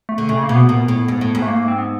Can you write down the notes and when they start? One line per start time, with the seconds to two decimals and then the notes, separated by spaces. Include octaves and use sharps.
0.09 A3
0.18 D3
0.29 C#3 A3
0.43 A#3
0.49 B2
0.55 B3
0.69 A#2
0.88 A2
1.08 G#2
1.21 A2
1.35 G#2
1.42 A3
1.48 A#3
1.68 C4
1.78 B3